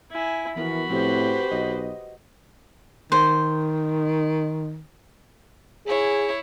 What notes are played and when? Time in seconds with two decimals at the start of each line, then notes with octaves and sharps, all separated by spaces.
0.11 E4 G#5
0.56 E3 F3 B3 F#4 A#4 B5
0.89 A2 F3 C4 G4 B4 C5
1.51 B1 D#5
3.12 D#3 C5
5.86 E4 G#4 C#5